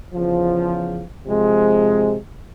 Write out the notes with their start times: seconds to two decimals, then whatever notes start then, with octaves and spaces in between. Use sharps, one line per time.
0.14 E2 C#3 F3
1.26 C3 F3 G#3 C4